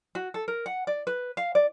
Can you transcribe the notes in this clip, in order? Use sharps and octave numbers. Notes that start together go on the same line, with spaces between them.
F#4
A4
A#4
F#5
D5
B4
F5
D5